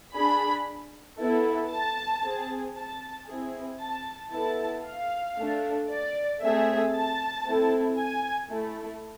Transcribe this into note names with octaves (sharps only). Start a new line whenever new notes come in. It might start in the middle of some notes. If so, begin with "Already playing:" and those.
D4 G#4 B5
B3 E4 A4
A5
C4 G#4
A5
C4 E4 G#4
A5
B3 E4 A4 A5
F5
A3 D4 A4
D5
A3 C4 G#4 E5
A5
A3 C4 E4 A4
G#5
A3 E4 A4